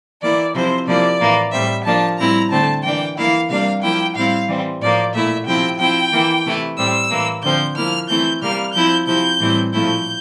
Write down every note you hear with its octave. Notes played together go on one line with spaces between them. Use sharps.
E3 A#3 E4 D5
C3 F3 C4 E4 C5
C3 F3 A#3 E4 D5
A2 E3 A#3
A2 G3 C4 E5
F3 A#3 D4 A5
A2 G3 C4 E4 A#5
D3 A3 C4 A5
E3 A#3 D4 G5
E3 A#3 E4 F5
C3 G3 A#3 D4 F5
F3 A#3 E4 G5
A2 G3 C4 E4 F5
E3 G3 C4
A2 F3 A#3 D5
A#2 A3 E4 E5
C3 F3 C4 E4 G5
F3 C4 E4 G5
E3 A#3 E4
C3 E3 A3 E4
A2 G3 C4 E6
A2 E3 A#3
D3 F3 C4 G6
F3 A#3 E4 F6
E3 A3 C4 E4 G6
C3 G3 A#3 F6
F3 C4 E4 G6
C3 F3 C4 E4 G6
A2 E3 G3 C4 E4
A#2 F3 A3 C4 E4 G6